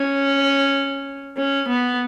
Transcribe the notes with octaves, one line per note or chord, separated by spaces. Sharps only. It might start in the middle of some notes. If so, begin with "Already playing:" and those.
Already playing: C#4
C#4
B3